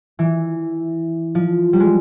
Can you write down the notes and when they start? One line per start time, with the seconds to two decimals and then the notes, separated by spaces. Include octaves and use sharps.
0.19 E3
1.35 F3
1.73 G3
1.80 G#3